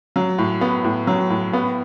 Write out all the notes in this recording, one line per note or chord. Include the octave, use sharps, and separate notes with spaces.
F#3
A2
B3
A2
F#3
A2
B3